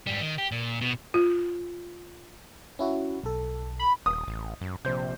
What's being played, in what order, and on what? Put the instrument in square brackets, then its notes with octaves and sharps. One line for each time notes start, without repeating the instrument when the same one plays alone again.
[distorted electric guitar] G#2 G3
D#3
G4
A#2
B2
[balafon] F4
[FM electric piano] C#4 E4 F#4
B1 A4
[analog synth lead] B5
[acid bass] D#1 [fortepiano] D#6
[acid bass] A1
F#2
[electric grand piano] A#1 C5 G6 [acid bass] C3